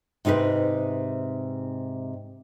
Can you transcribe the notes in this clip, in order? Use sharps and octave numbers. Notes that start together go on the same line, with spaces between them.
G#2 C3 D#4 G#4 B4